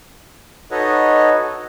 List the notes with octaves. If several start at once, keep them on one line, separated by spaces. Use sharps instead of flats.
D#4 F#4 A4 B4 C#5 D#5